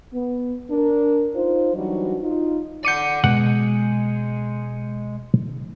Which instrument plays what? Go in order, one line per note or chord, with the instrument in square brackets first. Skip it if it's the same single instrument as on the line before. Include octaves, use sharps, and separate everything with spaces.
[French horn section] B3
D4 A#4
D#4 F4 C5
E3 F#3 G3 D4 D#4 F#4
D#4 F4
[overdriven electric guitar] D5 F#5 [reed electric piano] D6 [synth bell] G6 C#7 D#7
[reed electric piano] B2 [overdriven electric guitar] G#3 [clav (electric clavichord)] F#5